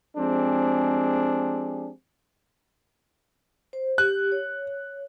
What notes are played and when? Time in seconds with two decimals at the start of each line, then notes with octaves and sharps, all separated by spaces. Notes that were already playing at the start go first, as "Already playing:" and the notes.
0.16 F3 G#3 C4 D4 G4 G#4
3.73 C5
3.98 G4 F#6
4.32 C#5